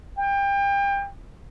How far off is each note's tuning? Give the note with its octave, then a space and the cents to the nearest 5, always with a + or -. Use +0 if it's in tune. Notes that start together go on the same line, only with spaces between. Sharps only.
G5 +30